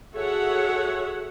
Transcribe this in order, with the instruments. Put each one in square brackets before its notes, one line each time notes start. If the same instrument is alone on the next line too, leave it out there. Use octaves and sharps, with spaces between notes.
[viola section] F#4 G#4 A4 C#5 E5 F#5